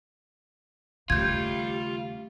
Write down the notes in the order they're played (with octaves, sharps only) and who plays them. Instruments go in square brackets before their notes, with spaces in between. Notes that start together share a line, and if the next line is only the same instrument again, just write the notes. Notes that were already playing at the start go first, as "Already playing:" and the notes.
[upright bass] D#2 C#3 [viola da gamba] G3 A3 [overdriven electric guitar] F4 [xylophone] G6 G#6